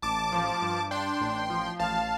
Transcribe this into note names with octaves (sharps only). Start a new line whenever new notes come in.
A1 A5 D6
F3
G2
D4 G5 C6
A1
F3
A1 F5 A5